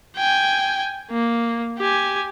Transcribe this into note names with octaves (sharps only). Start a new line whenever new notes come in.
G5 G#5
A#3
G4 G#5